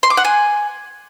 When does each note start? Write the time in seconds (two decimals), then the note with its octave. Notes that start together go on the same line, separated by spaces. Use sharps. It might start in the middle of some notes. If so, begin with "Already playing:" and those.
0.03 C6
0.10 D6
0.17 F#5
0.25 G#5